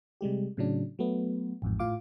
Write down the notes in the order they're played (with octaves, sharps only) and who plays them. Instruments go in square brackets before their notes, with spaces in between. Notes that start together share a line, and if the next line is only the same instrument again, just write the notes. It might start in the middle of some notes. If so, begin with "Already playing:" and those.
[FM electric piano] C3 G3 G#3 G4
A2 C#3 F#3 D4
F#3 A3 B3
A1 F2 G#2
A2 F4 F5 D6